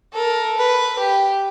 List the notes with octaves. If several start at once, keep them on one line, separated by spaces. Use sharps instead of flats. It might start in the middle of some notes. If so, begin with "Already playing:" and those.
A4 A#4
B4
G4